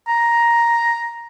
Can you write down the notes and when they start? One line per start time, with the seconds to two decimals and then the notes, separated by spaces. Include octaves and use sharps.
0.08 A#5